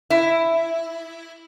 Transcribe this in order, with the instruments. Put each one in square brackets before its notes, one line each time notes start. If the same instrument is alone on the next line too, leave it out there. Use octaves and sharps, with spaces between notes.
[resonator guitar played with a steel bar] E4